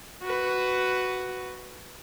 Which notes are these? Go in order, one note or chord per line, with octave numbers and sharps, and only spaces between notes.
F#4 B4